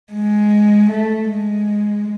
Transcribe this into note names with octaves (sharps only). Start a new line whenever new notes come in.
G#3
A3
G#3